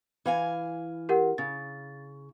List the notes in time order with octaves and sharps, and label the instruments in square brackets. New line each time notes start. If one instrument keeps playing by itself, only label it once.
[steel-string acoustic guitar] E3 F5 G#5
[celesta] G4 A#4 F#5
[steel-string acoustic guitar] C#3 [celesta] A6